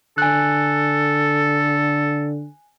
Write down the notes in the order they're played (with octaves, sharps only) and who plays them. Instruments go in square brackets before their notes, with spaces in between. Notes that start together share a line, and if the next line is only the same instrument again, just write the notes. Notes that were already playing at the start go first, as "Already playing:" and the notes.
[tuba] D3 [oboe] A4 [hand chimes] G#5 F#6